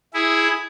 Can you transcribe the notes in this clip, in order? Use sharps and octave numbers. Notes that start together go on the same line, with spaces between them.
E4 G#4